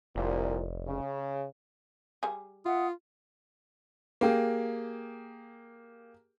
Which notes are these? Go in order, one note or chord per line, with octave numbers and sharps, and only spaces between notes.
F1 C2 A#2
C#3
G3 G#4
F4 E5 F#5 D#6
A#3 G4 G#4